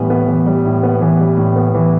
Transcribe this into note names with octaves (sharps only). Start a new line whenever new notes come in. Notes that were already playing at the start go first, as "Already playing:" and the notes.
Already playing: A2 E3 G3 B3
B3
E3
G3
A2
B3
E3
G3
A2
B3
E3